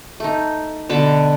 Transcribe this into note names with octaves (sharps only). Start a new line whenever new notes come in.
A3 D#4
B2 D3 A5 B5